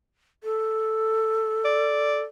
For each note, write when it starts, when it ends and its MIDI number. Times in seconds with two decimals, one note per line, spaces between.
0.44 2.22 69
1.65 2.25 74